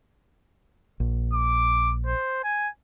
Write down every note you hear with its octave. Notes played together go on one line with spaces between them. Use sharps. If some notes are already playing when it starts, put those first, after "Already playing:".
A#1
D6
C5
G#5